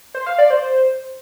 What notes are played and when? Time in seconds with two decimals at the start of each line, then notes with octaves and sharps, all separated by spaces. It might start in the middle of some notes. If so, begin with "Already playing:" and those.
0.15 C5
0.27 F5
0.38 D5
0.50 C5